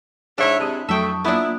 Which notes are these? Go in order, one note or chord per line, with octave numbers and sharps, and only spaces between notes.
G#2 D4 E4 C#5 E5
C3 G#3 D5 A5 D#6
F2 F#3 A3 E5 G5 A5 C#6 D#6
A#3 B3 D4 E4 F4 D#6